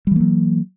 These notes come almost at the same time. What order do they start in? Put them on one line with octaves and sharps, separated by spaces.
G3 E3 A#3 F#3